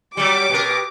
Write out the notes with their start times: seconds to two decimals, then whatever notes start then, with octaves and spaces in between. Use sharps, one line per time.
0.17 F#3 G3 G4 D6
0.50 B2 A#4